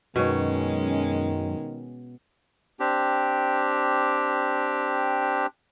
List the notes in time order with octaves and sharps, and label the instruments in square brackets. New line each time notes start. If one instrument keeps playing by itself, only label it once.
[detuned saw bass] F#2 [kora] B2 C#5 [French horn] D#3 [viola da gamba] G#3 C#4
[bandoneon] C4 D4 G4